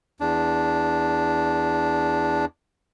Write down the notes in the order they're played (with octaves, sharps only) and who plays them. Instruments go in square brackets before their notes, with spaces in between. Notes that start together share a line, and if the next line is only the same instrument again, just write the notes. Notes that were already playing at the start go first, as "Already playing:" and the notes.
[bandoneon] E2 D4